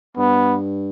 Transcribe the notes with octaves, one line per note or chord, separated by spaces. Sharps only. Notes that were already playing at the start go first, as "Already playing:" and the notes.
G2 B3